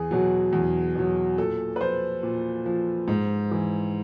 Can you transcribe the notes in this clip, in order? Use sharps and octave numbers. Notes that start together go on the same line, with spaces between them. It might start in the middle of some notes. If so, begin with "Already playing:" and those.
Already playing: E2 G#4
B2 F#3
E2
B2 F#3
A#2 A4
B4
F3 C5
A#2
F3
G#2
E3